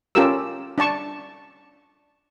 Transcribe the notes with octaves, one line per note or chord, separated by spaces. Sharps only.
C#4 F4 G4 A4 A#4 E6
D4 D5 A5 C#6